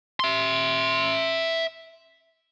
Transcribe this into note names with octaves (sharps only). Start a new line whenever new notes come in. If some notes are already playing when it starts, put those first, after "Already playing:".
E5 C6